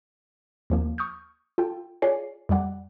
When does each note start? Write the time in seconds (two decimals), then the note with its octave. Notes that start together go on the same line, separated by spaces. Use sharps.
0.70 D#2 F3 A#3
0.98 C#6 D#6 F6 G6
1.58 F4 A4 G5
2.02 F4 G#4 C#5 D5 G#5 C7
2.49 F2 G3 D5 F#5